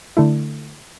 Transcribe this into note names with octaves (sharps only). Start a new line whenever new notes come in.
D3 A3 E4